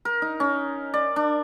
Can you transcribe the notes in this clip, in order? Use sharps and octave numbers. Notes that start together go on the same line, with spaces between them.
A#4
D#4
C#4
D5
D4